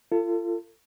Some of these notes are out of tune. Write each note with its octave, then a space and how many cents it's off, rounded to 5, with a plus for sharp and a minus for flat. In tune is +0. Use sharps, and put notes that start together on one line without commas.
F4 -30 A4 +30